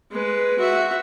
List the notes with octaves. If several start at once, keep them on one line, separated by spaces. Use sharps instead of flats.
G#3 B4
F#4 E5